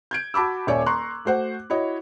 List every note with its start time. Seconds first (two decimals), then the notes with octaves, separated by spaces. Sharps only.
0.11 G6 G#6 D7
0.34 F#4 A5 B5 D6 E6
0.67 D#1 C#5 D5 E5 G#5
0.86 A#5 C6 C#6 F#6
1.25 A3 F#4 C5 F#5
1.70 E4 F#4 C#5 D#5